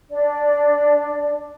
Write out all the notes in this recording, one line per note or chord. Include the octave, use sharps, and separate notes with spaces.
D4 D5